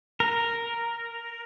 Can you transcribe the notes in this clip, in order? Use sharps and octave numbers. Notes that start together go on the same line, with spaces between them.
A#4